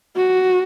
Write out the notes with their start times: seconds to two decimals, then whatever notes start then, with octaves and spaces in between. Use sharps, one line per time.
0.16 F#4